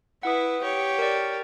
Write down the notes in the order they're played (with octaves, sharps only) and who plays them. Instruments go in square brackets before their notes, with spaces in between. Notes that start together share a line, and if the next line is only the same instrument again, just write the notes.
[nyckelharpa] E4 B4 [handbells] F#5 D#6
[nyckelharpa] G4 C#5
[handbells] A#4 D5